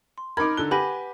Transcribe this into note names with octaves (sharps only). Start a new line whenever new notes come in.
C6
D#4 A#4 B5 D6 G#6 D7
D3 A4 F#6 G7
G4 B4 F#5 G#5 B5 A#6